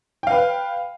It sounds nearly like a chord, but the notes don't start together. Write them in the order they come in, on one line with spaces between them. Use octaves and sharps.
G5 F5 B4